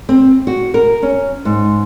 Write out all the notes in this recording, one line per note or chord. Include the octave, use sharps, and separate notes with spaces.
C4
F#4
A#4
C#4
G#2